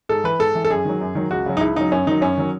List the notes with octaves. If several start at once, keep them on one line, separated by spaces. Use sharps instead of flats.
G#2 A4
E3 B4
G#2 A4
E3
A4
F#2 G#4
D#3 F#3
F#2
D#3 F#3
C#2 F#4
C#3 F#3
D#4
C#2 E4
C#3 F#3 D#4
F#2 C#4
D#3 F#3 D#4
F#2 C#4
D#3 F#3